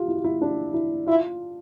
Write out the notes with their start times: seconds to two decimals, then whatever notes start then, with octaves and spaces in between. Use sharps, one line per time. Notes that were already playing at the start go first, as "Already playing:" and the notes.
Already playing: F4 G4
0.08 E4
0.16 F4
0.24 E4
0.42 D4
0.74 E4
1.07 E4 F4